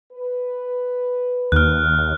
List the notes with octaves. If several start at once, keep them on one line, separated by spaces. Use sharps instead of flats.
B4
D#2 F6 F#6